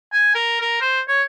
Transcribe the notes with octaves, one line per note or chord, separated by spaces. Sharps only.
G#5
A#4
A#4
C5
C#5